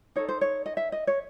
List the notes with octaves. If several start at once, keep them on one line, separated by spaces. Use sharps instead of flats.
D#4 A4 C#5
C5
C#5
D#5
E5
D#5
C#5